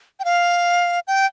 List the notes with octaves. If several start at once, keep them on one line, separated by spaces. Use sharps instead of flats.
G5
F5
G5